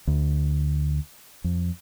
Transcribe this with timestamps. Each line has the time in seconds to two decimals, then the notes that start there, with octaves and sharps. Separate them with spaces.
0.07 D2
1.44 F2